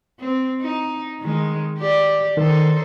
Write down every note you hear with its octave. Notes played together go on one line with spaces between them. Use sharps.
C4
D#4
D#3 G#3
G4 D5
D#3 D#4 A4 C5